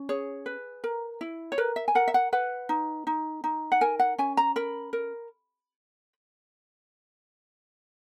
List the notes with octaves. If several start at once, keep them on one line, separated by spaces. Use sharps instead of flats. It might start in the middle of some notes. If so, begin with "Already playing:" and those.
Already playing: C#4
G#4 C#5
B4
A#4
E4
C#5
A#4 B4
E5
G#5
A#4 F#5
E5
F#5
B4 F#5
D#4
D#4
D#4
F#5
A#4 G#5
F#5
C#4 G#5
A#5
A#4 B5
A#4